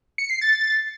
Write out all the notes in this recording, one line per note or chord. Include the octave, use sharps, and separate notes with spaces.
C#7
C7
A6